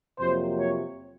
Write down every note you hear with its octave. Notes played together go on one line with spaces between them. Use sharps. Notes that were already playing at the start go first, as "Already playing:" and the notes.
F2 C3 F#3 A#3 C5
C#5